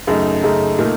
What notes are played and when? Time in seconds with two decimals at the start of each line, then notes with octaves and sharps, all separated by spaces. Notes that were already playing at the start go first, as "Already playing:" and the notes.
0.07 F#2 C#3 A3 D#4
0.43 F#2 C#3 A3 D#4
0.78 A#2 A3 D#4 A#4